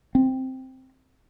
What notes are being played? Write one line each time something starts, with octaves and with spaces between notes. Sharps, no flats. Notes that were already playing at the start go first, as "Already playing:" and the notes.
C4